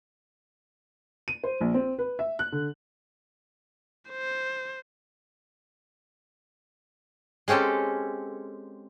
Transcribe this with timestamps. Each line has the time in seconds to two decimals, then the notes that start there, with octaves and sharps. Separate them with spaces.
1.28 D#7
1.44 C5
1.61 A#1
1.74 C4
1.99 B4
2.19 E5
2.39 F#6
2.52 D3
4.09 C5
7.48 G#3 C4 C#4 G4 A4